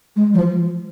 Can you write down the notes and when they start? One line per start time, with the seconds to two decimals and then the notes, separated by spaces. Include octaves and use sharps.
0.16 G#3
0.34 F3